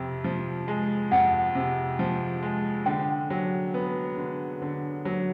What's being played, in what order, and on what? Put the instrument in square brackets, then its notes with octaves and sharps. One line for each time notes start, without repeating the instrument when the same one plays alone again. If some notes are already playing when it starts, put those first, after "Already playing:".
Already playing: [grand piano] F2 C3
F3
G#3
[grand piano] F2 [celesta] F#5
[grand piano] C3
F3
G#3
[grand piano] D3 [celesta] G5
[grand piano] F#3
B3
D3
D3
F#3